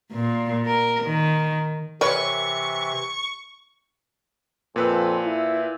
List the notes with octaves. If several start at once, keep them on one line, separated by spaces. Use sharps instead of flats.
A#2
A#4
D#3
C3 E3 A#4 B4 C#5 C#6
F2 A#2 B4 E6
E4